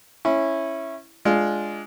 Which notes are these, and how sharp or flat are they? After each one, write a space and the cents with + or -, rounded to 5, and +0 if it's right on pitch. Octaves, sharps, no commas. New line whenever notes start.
C#4 -15 E4 +0
G#3 +10 D4 -5 F4 +0